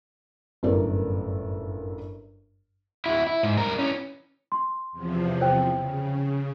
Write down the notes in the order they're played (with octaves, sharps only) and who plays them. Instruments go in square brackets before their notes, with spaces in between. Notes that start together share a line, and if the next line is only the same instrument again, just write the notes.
[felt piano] G1 F#2 A2 A4 A#4 D5
[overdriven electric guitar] D2 E4
E4
G#2
G3 A#4
E3 C#4
[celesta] C6
[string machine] E2 C3 F3
[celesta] C5 G5
[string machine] C#3